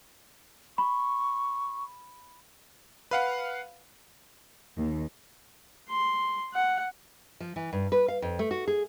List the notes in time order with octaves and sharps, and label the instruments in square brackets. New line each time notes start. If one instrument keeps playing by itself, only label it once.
[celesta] B5 [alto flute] C#6
[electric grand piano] B4 F5 F#5
[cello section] D#2
[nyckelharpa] C6
F#5
[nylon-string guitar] F3
E3
G2
B4
F5
F2
A3
F#4
G#4